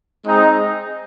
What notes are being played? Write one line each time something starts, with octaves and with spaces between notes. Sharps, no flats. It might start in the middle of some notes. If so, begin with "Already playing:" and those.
G#3 C4 D#4 G#4